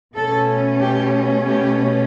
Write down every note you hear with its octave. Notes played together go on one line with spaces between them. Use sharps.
B2 A3 C#4 A4
G4
G4